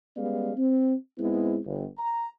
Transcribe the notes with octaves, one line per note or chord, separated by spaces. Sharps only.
G3 G#3 B3 C#4 D5 F5
C4
G#2 G#3 B3 C4 E4
G1
A#5